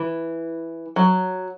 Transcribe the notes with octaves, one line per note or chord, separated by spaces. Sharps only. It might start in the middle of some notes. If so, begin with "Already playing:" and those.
Already playing: E3
F#3